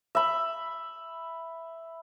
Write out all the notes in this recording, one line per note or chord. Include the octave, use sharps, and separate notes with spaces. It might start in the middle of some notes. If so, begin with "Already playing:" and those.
E5 B5